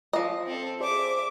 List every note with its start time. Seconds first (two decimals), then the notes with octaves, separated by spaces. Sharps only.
0.13 F3 D#5
0.47 C4 A4
0.80 G#4 C5 D5 E5 D6